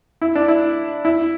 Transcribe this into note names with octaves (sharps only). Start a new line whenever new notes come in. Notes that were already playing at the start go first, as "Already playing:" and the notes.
E4
D4
E4
E4